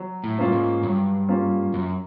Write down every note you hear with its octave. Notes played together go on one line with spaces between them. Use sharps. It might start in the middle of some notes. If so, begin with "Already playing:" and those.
Already playing: F#3
A2
G2 A#3 C#4 F4
G#2
G2 F#3
A#3 C#4 F4
F#2 F#3